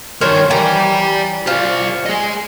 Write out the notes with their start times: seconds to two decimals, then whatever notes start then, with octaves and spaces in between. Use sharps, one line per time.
0.21 G2 D#3 A#4 C5 C#5
0.50 E3 D5 G5 A#5
1.47 F4 C5 D5
2.06 G#4 D#5